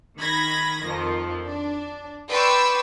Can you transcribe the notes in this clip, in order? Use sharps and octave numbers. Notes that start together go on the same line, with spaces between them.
D#3 B5 G#6 A#6
F2 D#3 F3
D4
B4 D5 G5 C6 C#6 E6